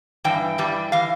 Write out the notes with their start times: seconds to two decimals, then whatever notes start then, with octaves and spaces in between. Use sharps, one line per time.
0.24 G2 E3 G5
0.58 G2 E3 G3
0.92 E3 F5